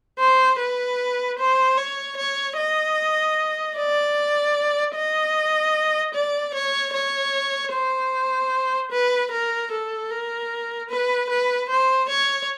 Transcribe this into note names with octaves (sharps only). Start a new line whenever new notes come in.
C5
B4
C5
C#5
C#5
D#5
D5
D#5
D5
C#5
C#5
C5
B4
A#4
A4
A#4
B4
B4
C5
C#5